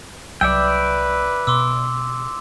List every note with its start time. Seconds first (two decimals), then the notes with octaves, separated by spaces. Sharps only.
0.41 C2 F#3 B4 D5 E5 G5 E6
1.47 B2 C6 D6 E6